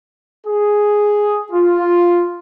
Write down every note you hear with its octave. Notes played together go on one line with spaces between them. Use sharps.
G#4
F4